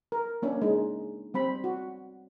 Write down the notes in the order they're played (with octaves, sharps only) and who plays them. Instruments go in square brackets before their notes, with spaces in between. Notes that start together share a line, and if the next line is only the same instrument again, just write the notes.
[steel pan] A#4
A#3 C#4 D4
G#3 D#4
G3 C4 B5
F#4